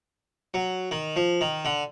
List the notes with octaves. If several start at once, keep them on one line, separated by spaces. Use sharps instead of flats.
F#3
D#3
F3
D#3
D3